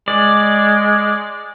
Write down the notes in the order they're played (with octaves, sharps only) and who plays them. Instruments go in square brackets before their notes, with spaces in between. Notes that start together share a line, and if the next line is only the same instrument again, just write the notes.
[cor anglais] G#3 [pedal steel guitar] D5